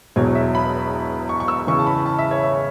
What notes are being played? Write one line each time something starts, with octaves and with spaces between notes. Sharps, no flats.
E1 E2 B2 F#3 C#5
E5
B5
C#6
C#6
E6
E2 C#3 E3 C#6
A5
B5
A5
E5
C#5
E5